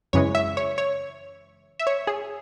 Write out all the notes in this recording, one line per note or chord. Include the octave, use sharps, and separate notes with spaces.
F#2 C#3 E3 G#3 C#5
E5
C#5
C#5
E5
C#5
G#4